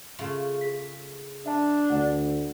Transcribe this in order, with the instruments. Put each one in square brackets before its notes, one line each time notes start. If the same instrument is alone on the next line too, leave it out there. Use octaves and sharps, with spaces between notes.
[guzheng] C#3 A3 F4
[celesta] G#4 B6
[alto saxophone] D4 [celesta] E5 A5
[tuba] D2 [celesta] D5 F#5